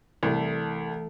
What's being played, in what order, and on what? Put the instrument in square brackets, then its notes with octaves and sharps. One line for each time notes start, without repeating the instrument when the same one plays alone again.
[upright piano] C2 [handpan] E3 A3 A4